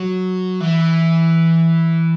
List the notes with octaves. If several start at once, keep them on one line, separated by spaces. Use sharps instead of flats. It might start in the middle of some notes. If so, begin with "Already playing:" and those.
Already playing: F#3
E3